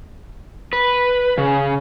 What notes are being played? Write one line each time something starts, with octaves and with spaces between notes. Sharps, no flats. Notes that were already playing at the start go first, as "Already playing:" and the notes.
B4
C#3